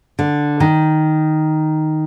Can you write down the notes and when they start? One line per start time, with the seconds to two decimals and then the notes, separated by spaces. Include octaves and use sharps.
0.19 D3
0.60 D#3